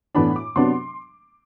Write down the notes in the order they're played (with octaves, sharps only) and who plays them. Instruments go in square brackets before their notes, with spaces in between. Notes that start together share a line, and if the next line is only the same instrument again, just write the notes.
[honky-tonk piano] A2 E3 B3 D4 B5
D6
C3 F#3 B3 D4 C6